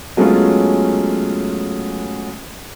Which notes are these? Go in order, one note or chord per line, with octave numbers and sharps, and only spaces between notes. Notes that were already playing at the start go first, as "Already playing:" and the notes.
F#3 G#3 A3 B3 C#4 F4